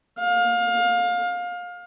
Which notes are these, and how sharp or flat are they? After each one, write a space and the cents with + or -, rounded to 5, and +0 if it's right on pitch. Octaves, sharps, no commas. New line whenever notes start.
F5 +25